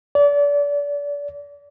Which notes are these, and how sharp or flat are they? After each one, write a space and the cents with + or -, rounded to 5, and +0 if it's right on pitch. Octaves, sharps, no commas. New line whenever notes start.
D5 -30